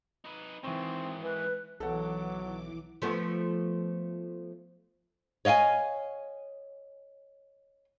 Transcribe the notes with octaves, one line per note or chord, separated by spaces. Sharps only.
D#4 B4
G#2 D#3 E3 C4 C#6
E3 B4
B1 E3 F#3 A4 F#5 D6
F3 A3 B3
C#5 D#5 F5 G5 G#5